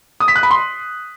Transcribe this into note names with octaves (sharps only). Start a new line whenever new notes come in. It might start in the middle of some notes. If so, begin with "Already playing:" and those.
D#6
B6
F#6
B5
C6